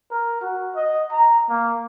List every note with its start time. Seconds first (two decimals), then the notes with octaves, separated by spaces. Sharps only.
0.11 A#4
0.41 F#4
0.75 D#5
1.11 A#5
1.49 A#3